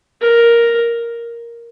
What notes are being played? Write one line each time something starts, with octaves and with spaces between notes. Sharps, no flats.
A#4